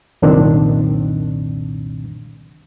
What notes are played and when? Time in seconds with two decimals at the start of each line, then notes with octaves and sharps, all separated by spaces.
0.22 C2 F#2 A#2 D#3 C4 D4